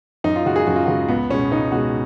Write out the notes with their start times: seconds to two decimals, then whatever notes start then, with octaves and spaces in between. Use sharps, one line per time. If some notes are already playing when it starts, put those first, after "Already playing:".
0.24 F#2 D#4
0.36 F4
0.46 C#3 G#3 F#4
0.56 G#4
0.66 F#2 F#4
0.76 F4
0.86 C#3 G#3 F#4
1.08 C#2 B3
1.30 B2 G#3 C#4
1.51 C#2 D#4
1.72 B2 G#3 F#4